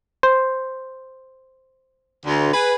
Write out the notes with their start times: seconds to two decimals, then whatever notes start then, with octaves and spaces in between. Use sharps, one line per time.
0.23 C5
2.26 D2
2.54 G#4 B4